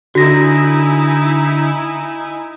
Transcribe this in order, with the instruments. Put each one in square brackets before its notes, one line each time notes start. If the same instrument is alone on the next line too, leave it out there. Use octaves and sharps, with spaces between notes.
[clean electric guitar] D3 [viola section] D#4 E4 G#5 [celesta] F#4 A#6